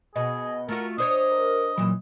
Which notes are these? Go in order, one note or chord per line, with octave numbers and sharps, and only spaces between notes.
B2 G#4 D#5
A3 F4 F#4 A#4
D4 C5 C#5 D#5 D#6
A#4
A#2 E3 F#3